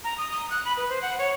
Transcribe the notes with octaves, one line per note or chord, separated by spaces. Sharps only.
A#5
D#6
D#6
F#6
B5
B4
C5
F#5
C#5